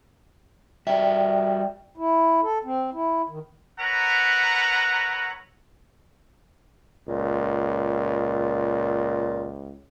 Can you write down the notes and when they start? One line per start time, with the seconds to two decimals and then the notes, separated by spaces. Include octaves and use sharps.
0.87 G3 F#4 D5 E5 G5
1.97 E4
2.43 A4
2.65 C4
2.94 E4
3.29 D#3
3.80 A#4 B4 C#5 E5 F#5 A#5
7.08 C#2 A#2